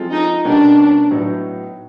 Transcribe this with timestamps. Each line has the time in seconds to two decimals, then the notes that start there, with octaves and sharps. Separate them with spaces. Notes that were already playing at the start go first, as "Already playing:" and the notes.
Already playing: F3 G#3 C4 F4 A4
0.13 D#4
0.45 B2 G3 A#3 C#4 D4 F#4
1.11 A2 F#3 B3 D#4 F#4